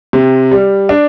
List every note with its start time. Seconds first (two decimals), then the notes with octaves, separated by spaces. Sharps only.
0.13 C3
0.51 G3
0.89 D4